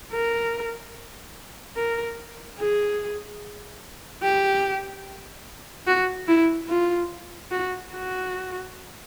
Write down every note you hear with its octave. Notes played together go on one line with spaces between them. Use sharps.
A#4
A#4
G#4
G4
F#4
E4
F4
F#4
F#4